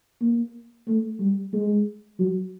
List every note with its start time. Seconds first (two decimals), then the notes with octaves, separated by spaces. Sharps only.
0.21 A#3
0.87 A3
1.19 G3
1.53 G#3
2.19 F#3